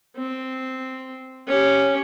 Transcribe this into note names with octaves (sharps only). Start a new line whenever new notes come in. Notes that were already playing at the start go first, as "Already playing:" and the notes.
C4
C#4 G4